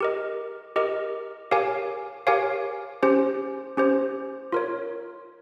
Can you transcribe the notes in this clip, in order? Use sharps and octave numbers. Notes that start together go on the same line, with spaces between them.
G4 A#4 D#5
G4 A#4 D#5
G4 A#4 C#5 F5 G#5
G4 A#4 C#5 F5 G#5
C#4 G4 C5
C#4 G4 C5
F4 A#4 C#5